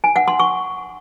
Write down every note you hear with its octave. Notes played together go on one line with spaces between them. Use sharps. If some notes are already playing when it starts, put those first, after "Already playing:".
G#5
F#5
C6
C#6